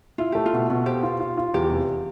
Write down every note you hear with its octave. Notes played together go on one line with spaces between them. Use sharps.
E4 F4
A3 G4
F4
B2
B2
G4 C5
F4
F4
F4
E2 G4
F1